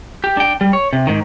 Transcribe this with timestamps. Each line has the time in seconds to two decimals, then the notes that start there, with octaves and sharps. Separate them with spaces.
0.24 G4
0.37 D4 G5
0.61 G3
0.73 C#5
0.93 C3
1.07 G#2 D#3